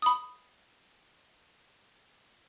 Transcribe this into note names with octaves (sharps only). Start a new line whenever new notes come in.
B5 D#6